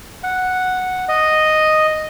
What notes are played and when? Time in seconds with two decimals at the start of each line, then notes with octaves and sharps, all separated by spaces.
0.23 F#5
1.09 D#5